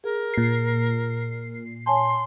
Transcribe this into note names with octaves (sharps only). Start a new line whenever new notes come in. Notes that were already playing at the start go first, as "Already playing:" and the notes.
G#4 A#4
A#2 C7
C#5 G#5 A5 C6